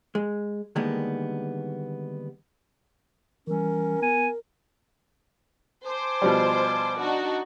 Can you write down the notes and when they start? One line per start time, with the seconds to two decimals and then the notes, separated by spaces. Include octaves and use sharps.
0.15 G#3
0.76 D3 D#3 G3 G#3 A#3 B3
3.47 E3 G3 C#4 A#4
4.02 B3 G#5
5.85 C5 G#5 A5 D6
6.22 B2 F3 G3
7.00 D4 D#4 F#4